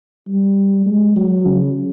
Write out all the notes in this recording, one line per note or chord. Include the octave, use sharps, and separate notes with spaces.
G3
G#3
F#3
C#3